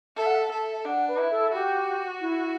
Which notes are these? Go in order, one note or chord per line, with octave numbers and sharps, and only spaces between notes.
A4 E5
F#5
E5
A4
D4 F#5
B4
E4
A4
F#4 G4
E4